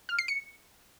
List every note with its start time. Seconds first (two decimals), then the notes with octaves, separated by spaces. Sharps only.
0.09 F6
0.19 C7
0.28 C#7